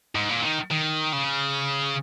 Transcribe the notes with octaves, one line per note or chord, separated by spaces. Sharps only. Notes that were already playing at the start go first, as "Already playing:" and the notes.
G#2
A#2
D#3
D#3
C#3